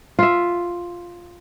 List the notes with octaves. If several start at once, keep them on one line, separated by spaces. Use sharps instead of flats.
F4 E5